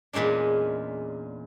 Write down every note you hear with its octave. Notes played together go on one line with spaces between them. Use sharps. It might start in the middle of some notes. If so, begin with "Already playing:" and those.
E2 A#2 G#3 C#4 D4